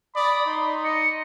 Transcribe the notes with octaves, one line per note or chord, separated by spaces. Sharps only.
D5 B5 D#6
D#4 C6
D#5 C#7